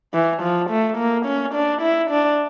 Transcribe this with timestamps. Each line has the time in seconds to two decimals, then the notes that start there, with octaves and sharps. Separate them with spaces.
0.14 E3
0.42 F3
0.70 A3
0.98 A#3
1.26 C#4
1.54 D4
1.82 E4
2.10 D4